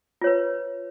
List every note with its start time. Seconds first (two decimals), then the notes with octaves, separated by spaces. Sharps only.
0.21 F4
0.24 C#5
0.27 B4